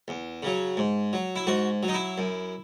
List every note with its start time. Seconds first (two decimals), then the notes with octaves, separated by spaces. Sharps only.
0.08 E2
0.43 C#3 F#3
0.77 G#2
1.13 F#3
1.36 E4
1.47 G#2 F#4
1.83 F#3
1.88 D#4
1.94 E4
2.18 F#2